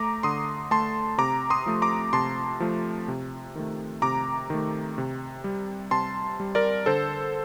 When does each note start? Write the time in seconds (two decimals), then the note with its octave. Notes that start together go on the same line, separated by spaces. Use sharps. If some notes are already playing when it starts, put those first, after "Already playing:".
Already playing: A3 A#5 D6
0.23 D3 C6 D#6
0.71 A3 A5 C6
1.18 C3 A#5 D6
1.50 C6 D#6
1.66 F3 A3
1.82 A#5 D6
2.13 C3 A5 C6
2.60 F3 A3
3.08 C3
3.55 D#3 A3
4.02 C3 A#5 D6
4.50 D#3 A3
4.98 C3
5.44 G3
5.91 C3 A5 C6
6.40 G3
6.55 A#4 D5
6.86 D3 A4 C5